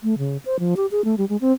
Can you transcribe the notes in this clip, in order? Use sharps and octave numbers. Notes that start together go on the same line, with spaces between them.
A3
C#3
C5
F3
G4
G#4
A3
G3
G#3
C4